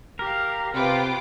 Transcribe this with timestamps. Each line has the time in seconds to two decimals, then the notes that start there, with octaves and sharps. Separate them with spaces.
0.19 G4 A#4 F5
0.74 C3 B3 F4 B4 G5 D6